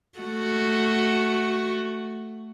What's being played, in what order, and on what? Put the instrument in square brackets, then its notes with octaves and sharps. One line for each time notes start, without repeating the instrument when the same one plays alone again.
[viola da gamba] A3 F#4